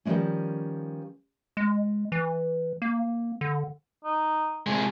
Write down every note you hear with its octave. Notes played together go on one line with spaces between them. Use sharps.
D#3 F3 G3 G#3 A#3 C#4
G#3
E3
A#3
D3
D#4
C3 G#3